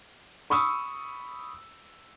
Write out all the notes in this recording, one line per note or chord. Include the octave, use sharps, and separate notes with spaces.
B5 C#6 D#6 E6